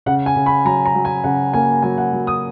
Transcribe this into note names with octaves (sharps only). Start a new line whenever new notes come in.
C#3 F#5
G#5
C#3
B5
F#3 A#5
A#5
F#3
G#5
C#3 F#5
A#3 G#5
F#3 G#5
F#5
F#3
D#6